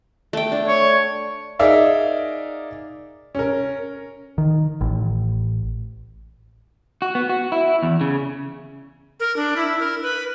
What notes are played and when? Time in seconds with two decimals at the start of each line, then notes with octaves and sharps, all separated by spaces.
0.33 A3 G5
0.52 D4
0.68 C#5
1.59 D#4 G#4 A#4 D5 E5 F5
3.35 C#4 A#4
4.38 D#3
4.81 A1
7.02 F#4
7.15 B3
7.29 F#4
7.52 E4
7.83 E2
8.01 C#3
9.20 A#4
9.36 D4
9.56 E4
9.79 A#4
10.02 B4